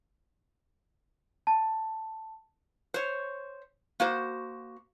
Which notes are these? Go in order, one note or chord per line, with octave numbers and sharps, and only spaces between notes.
A5
C5 C#5
A#3 F#4 C5